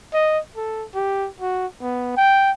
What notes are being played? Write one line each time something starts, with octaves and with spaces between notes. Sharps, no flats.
D#5
A4
G4
F#4
B3
G5